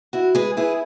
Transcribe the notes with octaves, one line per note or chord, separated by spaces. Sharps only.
E4 F#4
G#3 G#4 B4
E4 G#4 B4